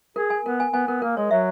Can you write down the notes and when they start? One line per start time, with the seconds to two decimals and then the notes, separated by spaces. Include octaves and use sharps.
0.16 G#4 A#4
0.30 G#5
0.45 B3 A#4
0.60 G#5
0.73 B3 G#5
0.88 B3 A#4
1.02 A#3 A#4
1.17 G#3 C#5
1.31 F#3 E5